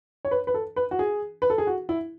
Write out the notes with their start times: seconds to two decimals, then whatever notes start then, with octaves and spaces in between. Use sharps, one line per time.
0.25 C#5
0.31 B4
0.47 B4
0.54 A4
0.76 B4
0.91 F#4
0.99 G#4
1.42 B4
1.50 A4
1.58 G#4
1.67 F#4
1.89 E4